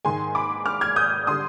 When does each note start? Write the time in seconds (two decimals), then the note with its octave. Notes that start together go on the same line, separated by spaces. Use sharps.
0.05 G#2 D#3 G#3 G#5 C6
0.35 B5 D6
0.66 D6 F6
0.81 F6 G#6
0.96 D#6 G6
1.27 D3 G3 C6 D#6